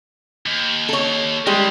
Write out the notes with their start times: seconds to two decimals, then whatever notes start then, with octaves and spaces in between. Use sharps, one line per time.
0.46 D#2
0.89 A4 C#5
1.47 D#3 G3 G#3 A#3